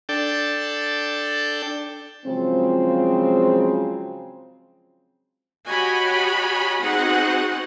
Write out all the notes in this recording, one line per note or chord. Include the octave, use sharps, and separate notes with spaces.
D4 A4 G5
C#3 F3 F#3 G#3 C4
F#4 G4 C#5 D#5 G#5 B5
C4 D#4 F#4 G#4 D#5 F#5